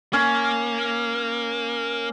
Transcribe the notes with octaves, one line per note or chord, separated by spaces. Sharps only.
A#3 C#4